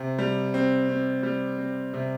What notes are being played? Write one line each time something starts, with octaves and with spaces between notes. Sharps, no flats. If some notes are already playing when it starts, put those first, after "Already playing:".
Already playing: C3 C4
G3
C4
C4
G3
C4
C3